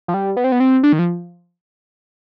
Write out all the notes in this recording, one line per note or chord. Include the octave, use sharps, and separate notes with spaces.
F3
G3
B3
C4
B3
C4
D4
D#3
F3